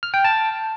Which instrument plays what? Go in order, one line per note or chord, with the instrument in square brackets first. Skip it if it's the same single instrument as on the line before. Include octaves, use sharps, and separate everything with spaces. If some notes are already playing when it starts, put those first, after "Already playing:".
[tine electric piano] F6
G5
A5